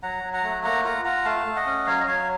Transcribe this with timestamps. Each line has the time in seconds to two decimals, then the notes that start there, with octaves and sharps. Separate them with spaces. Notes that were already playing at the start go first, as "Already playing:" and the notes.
0.03 F#3 F#5 A#5
0.23 F#3
0.33 F#5 A#5
0.44 A3
0.64 A#3 F#5 A#5
0.84 F4 F#5 A#5
1.05 F4 F#5 A#5
1.25 A3 F5 A5
1.46 A3
1.55 D#5 F#5
1.66 C#4
1.86 F#3 C#5 F5
2.00 D#5
2.07 F#3 C#5 F5